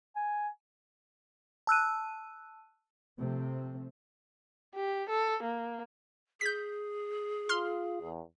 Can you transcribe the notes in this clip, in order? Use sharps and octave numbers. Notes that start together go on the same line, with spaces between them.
G#5
A5 E6 F#6 D#7
C3 F3 A3 C4
G4
A4
A#3
G#4 G6 B6
F4 C6 F6
E2